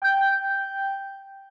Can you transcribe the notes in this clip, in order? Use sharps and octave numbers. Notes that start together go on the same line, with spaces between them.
G5 G6